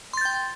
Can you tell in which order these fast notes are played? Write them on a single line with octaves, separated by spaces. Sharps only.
C6 A6 G6 G5